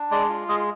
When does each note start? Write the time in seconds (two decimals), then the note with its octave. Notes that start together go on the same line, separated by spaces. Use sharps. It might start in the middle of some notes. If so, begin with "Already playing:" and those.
Already playing: D4
0.11 G#3 D5
0.29 F4
0.48 G#3 D#5